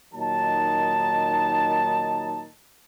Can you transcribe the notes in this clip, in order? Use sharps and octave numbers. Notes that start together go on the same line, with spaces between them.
A#2 D#3 F#3 D#4 A5